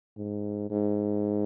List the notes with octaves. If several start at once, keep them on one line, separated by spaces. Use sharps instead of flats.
G#2
G#2